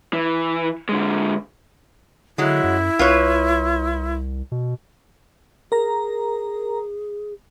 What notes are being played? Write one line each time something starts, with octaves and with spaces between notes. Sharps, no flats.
E3
D3 G#3
D3 F#3 G#3 E4
F#2
C2 F4 B4 C#5
B2
G#4 A#4 A#5